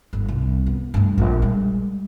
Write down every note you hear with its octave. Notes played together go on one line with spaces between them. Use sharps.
G1
C2
B3
G2 A3
A#1
G3 G#3